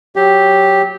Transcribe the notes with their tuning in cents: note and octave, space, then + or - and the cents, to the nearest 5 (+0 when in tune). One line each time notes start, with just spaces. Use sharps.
F#3 +0 G4 +0